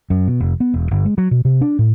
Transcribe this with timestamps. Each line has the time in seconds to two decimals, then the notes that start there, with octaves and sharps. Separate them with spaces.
0.10 F#2
0.28 B2
0.40 F1
0.60 B3
0.74 E1
0.91 G1
1.05 G#3
1.18 F#3
1.31 B2
1.45 C3
1.61 D4
1.79 A2